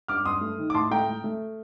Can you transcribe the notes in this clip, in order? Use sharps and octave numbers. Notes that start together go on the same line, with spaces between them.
G2 D6 F6
G2 C6 D#6
A3
D#3
D6
A2 A5 C6
A3 G5 A#5
A3
A3